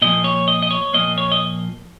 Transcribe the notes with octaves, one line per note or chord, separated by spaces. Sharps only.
A#2 F3 A#3 D#5
C#5
D#5
D#5
C#5
A#2 F3 A#3 D#5
C#5
D#5